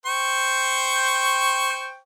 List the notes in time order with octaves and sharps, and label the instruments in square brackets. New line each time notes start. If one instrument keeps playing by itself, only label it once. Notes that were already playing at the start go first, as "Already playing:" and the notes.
[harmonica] C5 G5 C#6